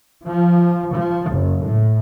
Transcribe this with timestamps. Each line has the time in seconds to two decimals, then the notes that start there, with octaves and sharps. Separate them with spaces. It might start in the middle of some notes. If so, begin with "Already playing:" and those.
0.25 F3
0.92 F3
1.31 F#1
1.62 A2